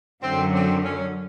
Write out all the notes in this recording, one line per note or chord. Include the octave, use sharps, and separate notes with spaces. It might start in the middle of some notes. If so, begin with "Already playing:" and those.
F#2 D3 F#3 C4
C4
C#4